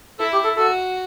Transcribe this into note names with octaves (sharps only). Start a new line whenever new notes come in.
E4 A4
G4
A4
F#4 A4